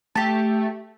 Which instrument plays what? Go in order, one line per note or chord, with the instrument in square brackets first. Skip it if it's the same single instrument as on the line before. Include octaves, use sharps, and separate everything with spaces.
[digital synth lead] A3 [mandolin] G4 A5